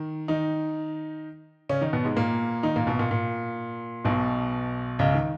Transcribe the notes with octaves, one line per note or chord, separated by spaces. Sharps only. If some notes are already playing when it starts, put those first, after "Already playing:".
Already playing: D#3
D#3 D#4
C#3 C#4
D#3 D#4
B2 B3
G#2 G#3
A#2 A#3
D#3 D#4
A#2 A#3
B1 B2
A#2
A#2
B1 B2
C#2 C#3
D#3